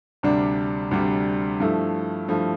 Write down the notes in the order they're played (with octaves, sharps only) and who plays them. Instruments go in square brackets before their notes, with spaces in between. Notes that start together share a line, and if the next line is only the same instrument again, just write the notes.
[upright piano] D2 C3 G3 D4
D2 C3 G3 D4
G2 F3 A3 E4
G2 F3 A3 E4